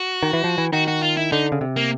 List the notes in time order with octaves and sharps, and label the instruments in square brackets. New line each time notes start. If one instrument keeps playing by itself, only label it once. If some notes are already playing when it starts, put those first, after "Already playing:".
Already playing: [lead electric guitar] F#4
[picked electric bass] D#3
E3
F3
E3
[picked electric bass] D#3 [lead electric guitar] F#4
[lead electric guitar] F#4
F4
E4
[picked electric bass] D3 [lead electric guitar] D#4
[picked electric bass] C#3
C3
[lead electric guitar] A#3